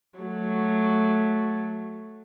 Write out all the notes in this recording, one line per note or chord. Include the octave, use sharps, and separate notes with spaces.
F#3 A3